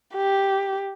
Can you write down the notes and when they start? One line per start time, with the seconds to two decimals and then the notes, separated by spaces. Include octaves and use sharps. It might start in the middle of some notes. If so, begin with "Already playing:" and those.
0.14 G4